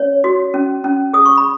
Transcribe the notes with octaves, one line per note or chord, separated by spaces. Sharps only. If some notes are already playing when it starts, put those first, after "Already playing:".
Already playing: C#4 C#5
F#4
C#4
C#4
G#4 D#6
C#6
B5